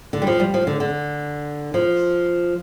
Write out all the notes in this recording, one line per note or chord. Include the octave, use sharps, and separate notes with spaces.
D3
G3
F3
G3
F3
D3
D3
F3